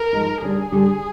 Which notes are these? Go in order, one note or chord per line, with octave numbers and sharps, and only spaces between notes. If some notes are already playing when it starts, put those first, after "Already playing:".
Already playing: A#4
F3 G#3 D#4
D3 G3 D4 G#4
D3 G3 D4